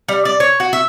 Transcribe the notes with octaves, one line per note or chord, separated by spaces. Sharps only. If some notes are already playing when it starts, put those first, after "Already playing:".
G3
D5
C#5
F#4
E5